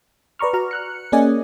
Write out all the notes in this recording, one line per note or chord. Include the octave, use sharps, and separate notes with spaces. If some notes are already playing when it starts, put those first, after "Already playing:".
B4 D5 A#5 C#6 F6
F#4 A#5 F6
F6 F#6 C#7
A#3 C#4 G#4 D5 D#5 G#5